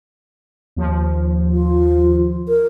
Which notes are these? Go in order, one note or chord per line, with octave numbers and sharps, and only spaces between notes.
D#2 F3
F4
A#4